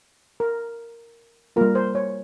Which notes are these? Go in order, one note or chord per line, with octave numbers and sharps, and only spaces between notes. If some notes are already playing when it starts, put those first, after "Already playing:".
A#4
G3 A#3 F4 A#4
C5
C#5